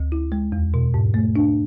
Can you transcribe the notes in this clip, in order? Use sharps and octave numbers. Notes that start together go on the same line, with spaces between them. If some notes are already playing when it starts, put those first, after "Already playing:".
Already playing: D2
E4
G#3
E2
B2
G#2
A3
D4